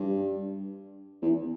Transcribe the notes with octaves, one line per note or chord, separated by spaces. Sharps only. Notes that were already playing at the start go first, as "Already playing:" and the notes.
Already playing: G2
E2